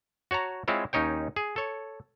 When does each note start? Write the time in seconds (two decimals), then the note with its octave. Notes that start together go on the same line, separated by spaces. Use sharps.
0.31 F#4 C#5 A5 A#5
0.68 G#3 C4 E4 F4 C#5
0.93 D#2 C#4 D#4 C#5 G5
1.36 G#4
1.56 A4 C#5